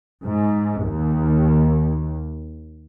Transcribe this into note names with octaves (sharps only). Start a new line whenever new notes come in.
G#2
D#2